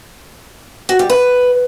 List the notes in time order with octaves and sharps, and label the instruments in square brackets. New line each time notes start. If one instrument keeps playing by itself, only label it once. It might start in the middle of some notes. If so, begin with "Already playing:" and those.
[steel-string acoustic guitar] F#4
G3
B4